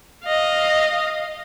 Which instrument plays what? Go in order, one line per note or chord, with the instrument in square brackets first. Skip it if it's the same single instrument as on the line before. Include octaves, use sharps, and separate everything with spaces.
[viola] D#5 F5